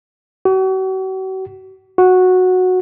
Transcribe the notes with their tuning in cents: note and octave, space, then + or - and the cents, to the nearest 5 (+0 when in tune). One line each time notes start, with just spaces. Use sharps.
F#4 +40
F#4 -10